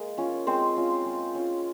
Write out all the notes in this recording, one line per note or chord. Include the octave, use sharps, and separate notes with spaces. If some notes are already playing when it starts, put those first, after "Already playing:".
Already playing: G#3 A#3 D#5
C#4 F4
G#3 C4 C5
C#4 F4
G#3
C#4 F4